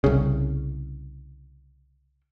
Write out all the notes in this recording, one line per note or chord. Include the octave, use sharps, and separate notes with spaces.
C2 C#3